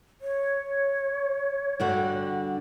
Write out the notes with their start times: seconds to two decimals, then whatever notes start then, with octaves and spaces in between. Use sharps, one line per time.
0.21 C#5
1.80 G2 D3 F#4